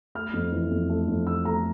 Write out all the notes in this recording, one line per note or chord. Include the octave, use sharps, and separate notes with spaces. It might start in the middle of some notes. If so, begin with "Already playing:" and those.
A3 F6
F2
E3
F2
A3
F2
A3 E6
A3 A#5